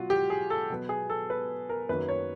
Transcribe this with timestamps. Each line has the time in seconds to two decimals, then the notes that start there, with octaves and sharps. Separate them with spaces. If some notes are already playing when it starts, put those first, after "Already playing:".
Already playing: B2 F#3 F4 F#4
0.10 G4
0.30 G#4
0.50 A4
0.70 B2 F#3 B3
0.89 G#4
1.10 A4
1.30 B4
1.69 A#4
1.89 F#2 D#3 F#3 A#3 B4
2.08 C#5